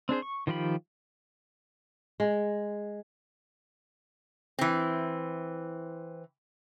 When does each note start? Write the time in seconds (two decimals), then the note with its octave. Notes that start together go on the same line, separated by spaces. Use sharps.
0.09 C4 D4 G#4 C5
0.22 C#6
0.47 D#3 F3 F4 G4 B5
2.20 G#3
4.59 E3 C4